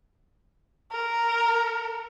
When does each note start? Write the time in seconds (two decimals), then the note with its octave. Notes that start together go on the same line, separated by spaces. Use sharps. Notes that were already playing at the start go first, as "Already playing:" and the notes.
0.92 A#4